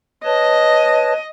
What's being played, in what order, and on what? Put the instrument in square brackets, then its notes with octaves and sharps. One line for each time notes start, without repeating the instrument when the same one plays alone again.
[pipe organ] B4 C#5 A5 [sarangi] D#5